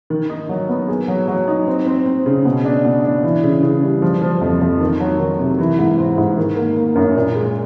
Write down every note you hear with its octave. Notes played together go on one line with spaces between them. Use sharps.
D#3
D#4
F#3
B3
G#4
F#3
F#3
D#4
C4
C4
C4
C#3
B2
D4
B2
D4
E3
C#3
C#3
G3
F3
F3
F2
F2
D#3
F#3
D#3
C3
E3
G#2
C4
G#2
D#3
A#3
A#3
F#2
A#2
G#3